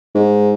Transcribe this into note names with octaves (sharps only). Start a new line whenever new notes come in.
G#2